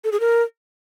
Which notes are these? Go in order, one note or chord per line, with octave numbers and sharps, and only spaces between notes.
A4
G#4
A#4